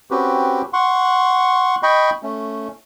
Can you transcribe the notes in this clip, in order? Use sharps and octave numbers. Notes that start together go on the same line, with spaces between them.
C4 C#4 F#4 G4 B4
F#5 C6 C#6
D#5 G5 B5 C#6
A3 C#4